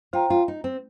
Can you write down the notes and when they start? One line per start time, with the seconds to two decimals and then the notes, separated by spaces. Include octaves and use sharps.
0.13 F4 C5 G5 A#5
0.30 F4
0.48 D#4
0.64 C4